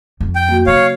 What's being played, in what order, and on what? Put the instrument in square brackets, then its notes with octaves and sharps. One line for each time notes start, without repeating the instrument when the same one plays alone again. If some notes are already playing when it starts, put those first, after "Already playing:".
[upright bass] F2
[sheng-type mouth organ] G5
[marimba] F#3 A#3 F#4
[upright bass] C#3 [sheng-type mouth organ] C#5 F5